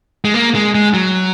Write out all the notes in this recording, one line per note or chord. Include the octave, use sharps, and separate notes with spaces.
G#3
A#3
G#3
G#3
F#3